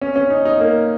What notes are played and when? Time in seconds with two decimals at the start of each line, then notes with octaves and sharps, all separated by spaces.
0.02 C#4
0.16 C#4
0.30 D#4
0.45 D#4
0.60 A#3